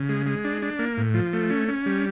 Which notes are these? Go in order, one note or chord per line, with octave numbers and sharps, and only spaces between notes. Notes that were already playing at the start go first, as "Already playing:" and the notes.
Already playing: C#3
G#3
G#3
D4
D4
A#3
A2
F3
A3
C#4
C#4
G3